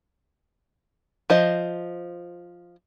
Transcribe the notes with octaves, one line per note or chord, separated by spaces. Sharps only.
F3 C5 D#5